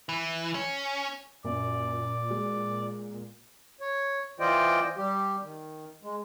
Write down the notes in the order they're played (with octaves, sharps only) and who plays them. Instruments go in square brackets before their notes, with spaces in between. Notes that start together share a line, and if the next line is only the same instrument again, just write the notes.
[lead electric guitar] E3
C#4
[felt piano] F#2 [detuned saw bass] A#2 [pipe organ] D5
[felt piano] G#3
[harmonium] C#5
E3 F4 C5 D5 D#5 G5
G3 G4
D#3
G#3